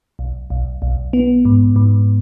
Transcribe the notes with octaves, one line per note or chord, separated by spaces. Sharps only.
B1
B1
B1
B3
G#2
G#2